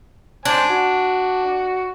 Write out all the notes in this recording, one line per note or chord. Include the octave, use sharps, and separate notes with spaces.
D4 C5 G#5
F#4